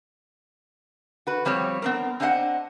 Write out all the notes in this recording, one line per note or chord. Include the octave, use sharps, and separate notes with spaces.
F#4 B4
F2 G3 C4 C#5
B3 C4 A#4
C4 D4 C5 D#5 F5 F#5